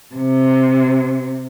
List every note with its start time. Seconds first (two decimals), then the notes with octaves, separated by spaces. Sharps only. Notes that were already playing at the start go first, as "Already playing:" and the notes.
0.15 C3